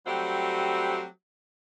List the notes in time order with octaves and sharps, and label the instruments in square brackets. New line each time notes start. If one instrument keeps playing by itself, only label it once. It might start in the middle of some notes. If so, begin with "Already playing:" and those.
[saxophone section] F#3 G3 A3 C4 F#4 G4